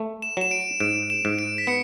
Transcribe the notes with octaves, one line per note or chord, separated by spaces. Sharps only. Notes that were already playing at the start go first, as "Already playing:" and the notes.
Already playing: A3
E7
F#3 E7
D7
G#2 D7
E7
G#2
D7
B6
B3 C#7